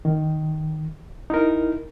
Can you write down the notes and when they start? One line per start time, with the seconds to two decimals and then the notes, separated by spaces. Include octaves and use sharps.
0.05 D#3
1.30 D#4 E4 A#4